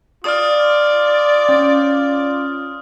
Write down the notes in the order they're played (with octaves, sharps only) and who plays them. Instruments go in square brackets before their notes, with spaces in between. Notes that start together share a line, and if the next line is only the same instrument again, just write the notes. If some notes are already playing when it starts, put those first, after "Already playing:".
[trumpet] F4 [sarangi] D5 [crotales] D#6 F6
[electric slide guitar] C#4 C#5 G5